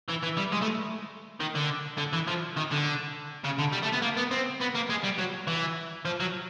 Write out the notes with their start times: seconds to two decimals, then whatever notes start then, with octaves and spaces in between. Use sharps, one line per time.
0.09 E3
0.24 E3
0.38 G3
0.53 G#3
0.62 A3
1.40 D#3
1.55 D3
1.98 D3
2.13 E3
2.27 F3
2.56 D#3
2.71 D3
3.44 C#3
3.58 D3
3.72 G3
3.82 A3
3.92 B3
4.02 A#3
4.17 B3
4.31 C4
4.61 B3
4.75 A#3
4.89 G#3
5.04 G3
5.18 F#3
5.47 E3
6.05 F3
6.20 F#3